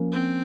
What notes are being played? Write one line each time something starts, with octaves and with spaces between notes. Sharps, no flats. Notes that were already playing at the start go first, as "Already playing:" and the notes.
Already playing: F3 A#3 C#4
C4